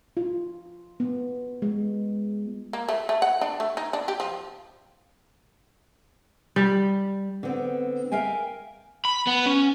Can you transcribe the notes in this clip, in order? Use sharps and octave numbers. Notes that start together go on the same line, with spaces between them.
F4
B3
G#3
A#3
A3
A3
F#5
D4
A3
D#4
D4
G4
F3
G3
D3 B3 C4
A#4 E5 F5 G5 G#5
B5
B3
C#4